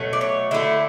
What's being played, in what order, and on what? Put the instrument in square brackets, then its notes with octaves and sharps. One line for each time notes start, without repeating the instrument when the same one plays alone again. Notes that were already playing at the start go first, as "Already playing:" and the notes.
Already playing: [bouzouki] B2 F#3 A3
D5
C#5
D3 A3 E4